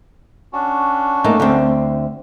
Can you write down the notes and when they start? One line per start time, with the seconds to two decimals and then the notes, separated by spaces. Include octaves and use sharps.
0.53 C#4 D4 F#4
1.24 A3 A#3 D#4
1.40 D2 C4